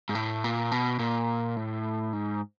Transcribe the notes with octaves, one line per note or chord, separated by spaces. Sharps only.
G#2
A2
A#2
B2
A#2
A2
G#2